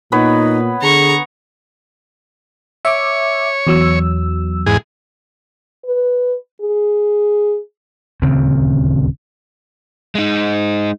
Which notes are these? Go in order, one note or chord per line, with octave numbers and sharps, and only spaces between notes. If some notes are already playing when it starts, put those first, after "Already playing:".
A#2 B3 D#4 B4 C#5
D3 G#4 A#5 C#6
C#5 E5 D6
E2 F#3 E6
E2 G#2 G#4
B4
G#4
D#1 D2 C#3 C4
G#3 D#4